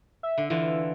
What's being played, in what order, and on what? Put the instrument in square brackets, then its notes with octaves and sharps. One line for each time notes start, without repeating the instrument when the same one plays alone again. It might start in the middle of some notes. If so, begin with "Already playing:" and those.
[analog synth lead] E5
[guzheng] D3
[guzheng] D3 E3 F4 [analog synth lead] E4